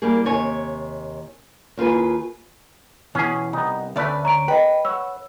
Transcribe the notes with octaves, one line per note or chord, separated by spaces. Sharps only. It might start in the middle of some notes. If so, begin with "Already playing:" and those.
G3 A#3 G4 G#4
D#2 C3 C#5 G#5
D#2 F4 G#4 B4 G#5
B2 E3 C#4 G#4
C2 B3 D#4
D2 A3 C#4 B4 D5
C#5 A#5 D7
B4 D#5 G5
C#5 F#5 E6